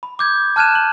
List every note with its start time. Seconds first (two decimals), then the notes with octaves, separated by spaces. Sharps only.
0.03 B5
0.19 D6 G6 G#6
0.56 A5 F6 F#6 G#6 D#7 E7
0.75 F#7